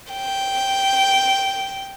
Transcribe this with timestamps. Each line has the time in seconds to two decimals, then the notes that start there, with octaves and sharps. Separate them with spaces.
0.13 G5